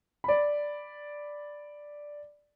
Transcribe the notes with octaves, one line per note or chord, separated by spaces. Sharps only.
D5 B5